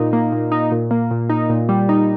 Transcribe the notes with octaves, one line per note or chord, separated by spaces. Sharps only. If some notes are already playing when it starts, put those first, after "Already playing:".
Already playing: A#2 D#4
A#3
A#2
D#4
A#2
A#3
A#2
D#4
A#2
G3
D#4